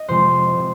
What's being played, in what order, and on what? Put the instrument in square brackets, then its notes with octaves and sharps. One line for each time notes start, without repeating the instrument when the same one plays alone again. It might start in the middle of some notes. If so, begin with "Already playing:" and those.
Already playing: [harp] D#5
F2 C3 F3 G#3 C5
C3